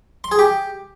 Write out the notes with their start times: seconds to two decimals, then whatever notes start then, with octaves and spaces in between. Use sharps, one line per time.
0.24 C6
0.32 G#4
0.39 G4